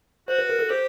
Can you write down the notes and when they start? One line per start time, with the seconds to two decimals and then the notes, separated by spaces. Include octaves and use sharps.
0.28 F#4 C5
0.39 B4
0.49 A#4
0.59 A4
0.69 G4 C5